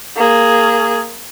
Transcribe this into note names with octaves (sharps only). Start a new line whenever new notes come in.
A#3 G#4